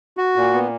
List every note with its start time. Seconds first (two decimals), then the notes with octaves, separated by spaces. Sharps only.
0.17 F#4
0.36 A#2
0.54 B3